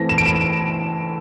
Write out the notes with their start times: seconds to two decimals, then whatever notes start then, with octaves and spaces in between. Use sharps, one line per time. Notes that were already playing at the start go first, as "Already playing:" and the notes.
Already playing: E3 A3 C4 A#6
0.09 E7
0.18 D7
0.26 E7